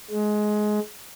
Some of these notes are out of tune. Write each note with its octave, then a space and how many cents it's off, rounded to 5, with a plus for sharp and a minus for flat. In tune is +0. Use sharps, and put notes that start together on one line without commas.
G#3 +20